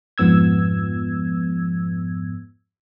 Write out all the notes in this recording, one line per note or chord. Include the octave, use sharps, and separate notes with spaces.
F2 G#2 F3 B3 E6 G#6